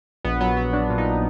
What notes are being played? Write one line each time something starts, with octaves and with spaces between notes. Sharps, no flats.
A#1 B3
F#3 B3
F#3 B3
F#3 D4
A#2
D#4